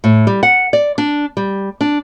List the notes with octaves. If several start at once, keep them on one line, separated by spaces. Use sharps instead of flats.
A2
G3
F#5
D5
D4
G3
D4